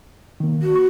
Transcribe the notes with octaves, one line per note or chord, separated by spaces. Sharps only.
D#3 A#3
F#4
C#6